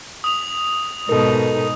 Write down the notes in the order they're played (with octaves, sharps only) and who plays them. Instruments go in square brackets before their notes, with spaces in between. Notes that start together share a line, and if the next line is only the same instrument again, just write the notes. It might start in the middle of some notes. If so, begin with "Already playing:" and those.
[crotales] D#6 F7
[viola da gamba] G#2 B2 D#4 [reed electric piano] A4 A#4